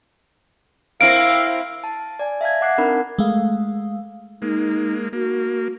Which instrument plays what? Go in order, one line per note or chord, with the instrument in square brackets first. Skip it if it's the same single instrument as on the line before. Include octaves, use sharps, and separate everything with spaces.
[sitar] A#3 C4 E4 [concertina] F5 [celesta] D7
[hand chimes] A5
D5 G#5
E5 F5 A5 G#6
D#5 F#5 D6 F#6 G#6 C7
C4 D4 D#4 A#4 B5
[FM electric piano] G#3 A3 F5
[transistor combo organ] G#3 A#3 [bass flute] D#4
[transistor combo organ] A#3 [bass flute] F#4